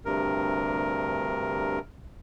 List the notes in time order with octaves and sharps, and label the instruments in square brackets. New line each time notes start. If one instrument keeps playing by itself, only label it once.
[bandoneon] D2 G2 C3 A#4